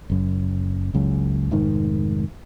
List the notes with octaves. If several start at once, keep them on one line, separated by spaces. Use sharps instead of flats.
F#1 F#2
F#1 C#2 F#2
F1 G#2 D#3